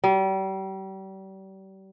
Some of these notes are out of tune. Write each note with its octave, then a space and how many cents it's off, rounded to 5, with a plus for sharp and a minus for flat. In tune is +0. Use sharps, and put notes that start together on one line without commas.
G3 -35